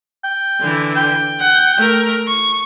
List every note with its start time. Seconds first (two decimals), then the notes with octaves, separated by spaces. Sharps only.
0.24 G5
0.60 D3 E3
0.97 G5
1.40 F#5
1.78 A3 A#4
2.27 C#6